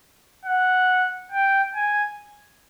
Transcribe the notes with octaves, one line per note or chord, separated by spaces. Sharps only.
F#5
G5
G#5